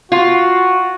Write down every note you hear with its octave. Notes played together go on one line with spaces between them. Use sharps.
F4 F#4